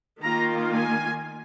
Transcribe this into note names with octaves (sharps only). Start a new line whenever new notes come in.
D#3 A#3 F4 A#5
G#5